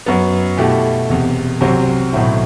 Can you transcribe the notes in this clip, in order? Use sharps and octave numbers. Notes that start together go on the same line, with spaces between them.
F#2 F#3 B3
B2 A3 E4 G4
E1 E2 C3
C2 C3 F#3 C4
B1 A2 F#3 C4 E4